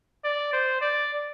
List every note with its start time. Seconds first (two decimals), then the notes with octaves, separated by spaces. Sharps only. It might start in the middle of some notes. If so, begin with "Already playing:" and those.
0.24 D5
0.53 C5
0.81 D5